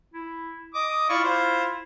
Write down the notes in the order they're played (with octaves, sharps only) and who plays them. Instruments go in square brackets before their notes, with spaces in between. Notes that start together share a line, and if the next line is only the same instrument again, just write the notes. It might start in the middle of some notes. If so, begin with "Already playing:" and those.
[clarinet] E4
[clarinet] D#5 [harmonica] D6 D#6
[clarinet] E4 [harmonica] F4 D5 C#6
[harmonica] F4 C5